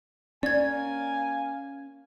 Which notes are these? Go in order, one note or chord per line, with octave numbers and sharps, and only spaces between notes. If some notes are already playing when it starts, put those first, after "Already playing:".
A#3 C#4 D5 F5 G#5 G#6